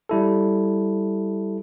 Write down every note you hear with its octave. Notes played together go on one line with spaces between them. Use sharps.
G3 E4 A4